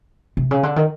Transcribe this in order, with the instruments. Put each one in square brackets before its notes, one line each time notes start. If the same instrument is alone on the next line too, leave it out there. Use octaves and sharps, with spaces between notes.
[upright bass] C3
C#3
D3
D#3